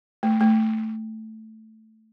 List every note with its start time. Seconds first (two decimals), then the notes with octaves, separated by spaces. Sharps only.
0.23 A3
0.41 A3